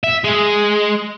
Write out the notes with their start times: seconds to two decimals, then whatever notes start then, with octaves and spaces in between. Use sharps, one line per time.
0.04 E5
0.24 G#3